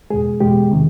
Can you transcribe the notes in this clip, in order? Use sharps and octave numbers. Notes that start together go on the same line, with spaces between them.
E2 B2 G#3 G#4
E2 B2 G#3 G4
C3 D#3